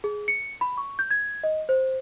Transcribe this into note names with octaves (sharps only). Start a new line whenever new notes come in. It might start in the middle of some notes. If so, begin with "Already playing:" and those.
G#4
C#7
B5
C#6
G6
G#6
D#5
C5